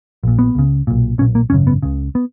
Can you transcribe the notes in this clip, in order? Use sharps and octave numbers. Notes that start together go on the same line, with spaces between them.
A#1 A#2
B3
C#2 C#3
B1 A#2
B1 A#2 C#4
A#3
G#1 F#2 C#3 C#4
B3
C#2 C#3
B3